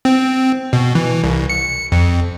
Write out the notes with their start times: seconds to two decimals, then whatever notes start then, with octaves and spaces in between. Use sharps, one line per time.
0.05 C4
0.73 B2
0.95 E3
1.23 C2
1.50 C#7
1.92 F2